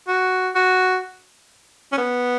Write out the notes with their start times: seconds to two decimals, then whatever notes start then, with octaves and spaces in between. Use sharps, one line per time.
0.08 F#4
0.55 F#4
1.92 C#4
1.98 B3